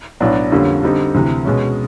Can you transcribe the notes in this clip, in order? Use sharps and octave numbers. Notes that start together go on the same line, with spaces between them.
B1 A2 F#3 B3 D4
F2 D3 G3 A#3 C#4
D3 G3 C4 D#4 G4
D2 C3 E3
B2 G#3 C#4